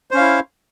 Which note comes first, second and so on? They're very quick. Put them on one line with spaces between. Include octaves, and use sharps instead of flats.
C5 C#4 F5 E4